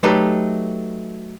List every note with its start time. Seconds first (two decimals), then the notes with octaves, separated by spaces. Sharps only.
0.03 F#3 A3 D#4 G4 A4 B4